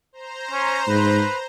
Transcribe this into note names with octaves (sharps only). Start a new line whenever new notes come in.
C5 A#5
C#4
G#2 B4